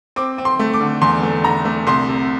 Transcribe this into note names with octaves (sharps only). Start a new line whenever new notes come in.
C4 D6
C4
C6
A3
D6
D3
E2 C6
A3
D3 A#5
A3
C2 C6
C3